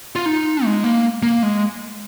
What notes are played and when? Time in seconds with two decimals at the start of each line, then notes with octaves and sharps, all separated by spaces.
0.16 F4
0.26 D#4
0.65 G#3
0.84 A#3
1.23 A#3
1.43 G#3